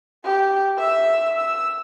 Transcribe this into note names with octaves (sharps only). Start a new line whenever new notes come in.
G4
E5 E6
E6